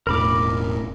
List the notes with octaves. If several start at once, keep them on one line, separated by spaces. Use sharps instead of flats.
E1 A2 A#4 B5 D6